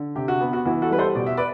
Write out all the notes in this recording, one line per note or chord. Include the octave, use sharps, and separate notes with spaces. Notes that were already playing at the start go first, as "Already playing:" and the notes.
Already playing: D3
C3 G4
F#4
B3
F#4
E3 F#4
F#4 A4
G3 B4
A4 C5
B2 D5
E5
B4 D5